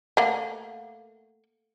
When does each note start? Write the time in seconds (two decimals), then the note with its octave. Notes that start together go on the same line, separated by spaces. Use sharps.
0.17 A3 A#3 F#5